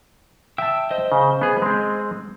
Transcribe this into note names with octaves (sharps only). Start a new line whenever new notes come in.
E5 G5 A5 E6
C5 D#5
C#3
B3 G#4
G#3 C4